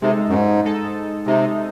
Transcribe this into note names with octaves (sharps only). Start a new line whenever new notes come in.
C3 G#3 D#4 A4
F#2
G#2
G#3 D#4 A4
C3 G#3 D#4 A4